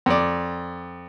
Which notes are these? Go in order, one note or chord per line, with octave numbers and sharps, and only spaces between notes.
F2 D5